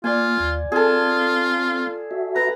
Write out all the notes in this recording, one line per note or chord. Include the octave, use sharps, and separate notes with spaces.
A#3 F4 D5 G#5
D#2
C4 F4 G#4 A4
F#4 E5
B4 A#5